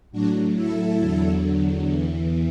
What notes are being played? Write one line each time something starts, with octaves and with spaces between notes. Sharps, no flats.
A2 F#3 D4 F#4
E4 A4
E2 D3 F#3
E2 E3